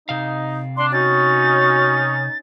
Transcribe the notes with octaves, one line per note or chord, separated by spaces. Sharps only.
C3 D#4 F5
D4 C6
C#4 D#4 F#4 A6